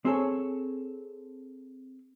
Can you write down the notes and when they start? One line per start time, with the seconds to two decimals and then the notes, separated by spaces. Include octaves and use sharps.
0.05 C4 G#4 A4 C#5